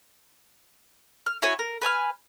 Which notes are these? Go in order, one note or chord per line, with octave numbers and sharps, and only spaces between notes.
F6
E4 F#4 C#5 G#5
A#4
B4 G#5 A5 F6